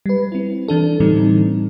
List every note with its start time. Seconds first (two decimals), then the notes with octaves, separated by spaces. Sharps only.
0.06 G3 B4
0.32 C4 E4
0.68 E3 D4 A4
1.00 A2 D3 E3 G3 C4 D#4